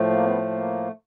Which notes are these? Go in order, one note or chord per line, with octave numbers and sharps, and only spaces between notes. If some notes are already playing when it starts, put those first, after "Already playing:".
Already playing: A2 F3 A3
A#3
B3
A#3